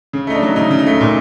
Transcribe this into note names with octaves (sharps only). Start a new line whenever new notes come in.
C#3
A3 D#4
D4
F#3
C#3 D#4
C#3
D#4
A3
A#2